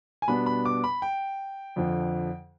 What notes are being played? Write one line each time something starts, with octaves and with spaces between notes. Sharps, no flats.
G#5
B2 G3 B3 D4 B5
B5
D6
B5
G5
F2 D3 F3